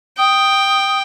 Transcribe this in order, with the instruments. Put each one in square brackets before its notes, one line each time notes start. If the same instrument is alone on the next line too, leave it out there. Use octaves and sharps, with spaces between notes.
[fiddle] G5 [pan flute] D#6